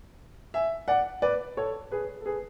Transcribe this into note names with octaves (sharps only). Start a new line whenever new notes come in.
E5 G#5
D5 F#5
B4 D5
A4 C#5
G#4 B4
A4
G#4 B4